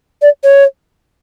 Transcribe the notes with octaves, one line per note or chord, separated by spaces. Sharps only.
D5
C#5